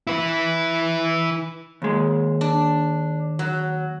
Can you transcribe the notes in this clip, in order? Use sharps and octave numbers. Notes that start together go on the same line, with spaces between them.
E4 B4
D#2 G#3
D4
F#3